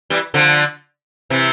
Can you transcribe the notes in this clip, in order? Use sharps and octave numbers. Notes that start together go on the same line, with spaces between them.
E3 G3
D3 F3
C3 E3